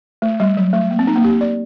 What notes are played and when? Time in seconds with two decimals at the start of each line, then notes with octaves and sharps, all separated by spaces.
0.22 A3
0.40 G3
0.57 F#3
0.73 A3
0.91 A#3
0.99 C4
1.07 D#4
1.16 A#3
1.24 G4
1.41 D5